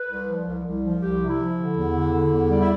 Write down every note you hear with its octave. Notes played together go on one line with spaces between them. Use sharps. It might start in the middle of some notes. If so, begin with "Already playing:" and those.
Already playing: B4
C2
F3
C2
C2
F3
C2 G4
C3
E4
F3
D3
E2
D3
D3
E2
G3
E4